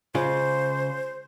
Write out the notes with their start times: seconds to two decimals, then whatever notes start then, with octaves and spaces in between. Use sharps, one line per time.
0.15 C#3 G#3 F4 C5